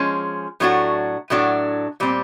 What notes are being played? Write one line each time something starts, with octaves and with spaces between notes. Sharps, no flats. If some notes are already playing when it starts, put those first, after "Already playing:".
Already playing: F3 G#3 C#4
A2 F#3 A3 D4 F#4
A2 F#3 A3 D4 F#4
A#2 G3 C4